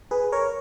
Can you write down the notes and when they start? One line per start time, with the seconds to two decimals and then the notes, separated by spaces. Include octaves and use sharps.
0.11 G#4 B4
0.32 A#4 C#5